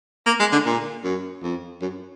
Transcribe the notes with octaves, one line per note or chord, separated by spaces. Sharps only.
A#3
G#3
D3
A#2
F#2
F2
F#2